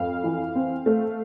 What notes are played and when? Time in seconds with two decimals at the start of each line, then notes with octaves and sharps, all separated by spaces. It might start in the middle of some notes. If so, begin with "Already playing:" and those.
Already playing: F2 F5
0.24 E3
0.55 C4
0.86 A3